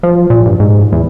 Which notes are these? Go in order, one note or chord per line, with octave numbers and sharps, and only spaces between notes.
F3
A#2
G2
G#2
E2